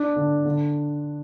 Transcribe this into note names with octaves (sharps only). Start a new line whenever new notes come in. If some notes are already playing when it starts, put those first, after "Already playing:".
Already playing: D4
D3
D3